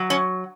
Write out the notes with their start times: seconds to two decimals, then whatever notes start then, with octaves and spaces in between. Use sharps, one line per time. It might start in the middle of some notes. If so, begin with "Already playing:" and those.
Already playing: F#3
0.10 C#4